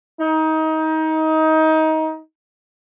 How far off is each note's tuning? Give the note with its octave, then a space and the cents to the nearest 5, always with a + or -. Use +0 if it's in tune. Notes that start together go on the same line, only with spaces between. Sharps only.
D#4 +25